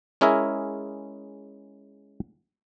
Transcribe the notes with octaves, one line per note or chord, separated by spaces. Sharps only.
G#3 C#4 E4 G#4 A#4 E5